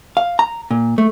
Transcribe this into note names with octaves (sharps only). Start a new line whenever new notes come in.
F5
A#5
A#2
A3